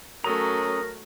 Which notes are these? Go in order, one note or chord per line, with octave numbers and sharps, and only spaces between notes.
F#3 A3 C#4 A4 A#4 A#5 D#6